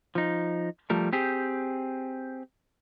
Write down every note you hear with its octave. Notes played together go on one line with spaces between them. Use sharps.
F3 D#4
F3 G3 A3 A#4
C4 G4 G#4